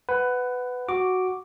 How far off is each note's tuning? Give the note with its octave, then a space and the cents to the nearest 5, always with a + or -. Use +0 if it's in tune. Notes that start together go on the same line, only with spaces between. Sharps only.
B4 +15 F#5 +0
F#4 +0 D6 +0